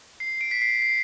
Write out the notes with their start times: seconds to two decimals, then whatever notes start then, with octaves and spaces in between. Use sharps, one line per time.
0.20 C7
0.41 D7
0.51 B6
0.62 C7
0.82 C7